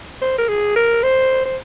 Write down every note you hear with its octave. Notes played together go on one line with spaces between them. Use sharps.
C5
A#4
G#4
A#4
C5
C5